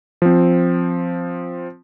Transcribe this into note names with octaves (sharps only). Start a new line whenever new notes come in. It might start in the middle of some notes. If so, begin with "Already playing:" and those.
F3 C4